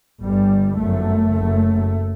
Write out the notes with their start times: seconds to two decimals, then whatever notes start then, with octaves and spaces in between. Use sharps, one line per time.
0.23 G1 G2 G3
0.78 G1 F#2 A3
1.34 F#1 F#2